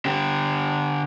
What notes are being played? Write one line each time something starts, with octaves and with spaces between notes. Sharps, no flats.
D3 G4